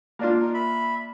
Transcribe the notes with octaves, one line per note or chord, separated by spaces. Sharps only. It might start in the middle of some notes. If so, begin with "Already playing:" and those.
A#3 D4 F4
D#4 A#4
E5 B5